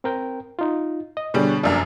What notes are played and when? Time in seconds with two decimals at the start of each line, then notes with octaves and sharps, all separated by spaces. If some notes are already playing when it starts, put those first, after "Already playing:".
0.04 C4 A#4 G5
0.59 D#4 F4
1.17 D#5
1.34 B2 D3 G3 G#4 C#5
1.63 F1 F#2 A#3 D4